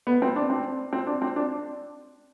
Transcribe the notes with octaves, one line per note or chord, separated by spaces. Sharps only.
B3
C4
D4
C4
C4
D4
C4
D4